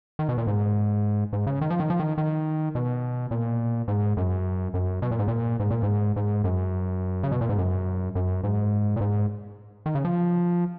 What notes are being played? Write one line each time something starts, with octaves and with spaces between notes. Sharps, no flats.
D#3
B2
A#2
G#2
G#2
C#3
D#3
F3
D#3
F3
D#3
D#3
B2
A#2
G#2
F#2
F#2
B2
A#2
G#2
A#2
G#2
A#2
G#2
G#2
F#2
C#3
B2
A#2
G#2
F#2
F#2
G#2
A#2
G#2
D#3
C#3
F3